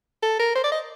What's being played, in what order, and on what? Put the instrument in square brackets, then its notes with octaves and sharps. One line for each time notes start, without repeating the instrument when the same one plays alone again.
[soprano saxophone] A4
A#4
C5
D5
D#5